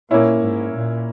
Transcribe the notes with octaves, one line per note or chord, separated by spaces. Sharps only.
A#2 A#3 C#4 E4
G#2
A#2